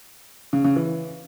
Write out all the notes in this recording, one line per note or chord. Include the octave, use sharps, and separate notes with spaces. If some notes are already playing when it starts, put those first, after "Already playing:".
C#3
C#3
E3